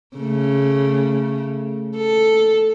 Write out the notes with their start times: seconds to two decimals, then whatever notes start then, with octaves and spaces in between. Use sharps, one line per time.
0.17 C#3 A3
1.96 A4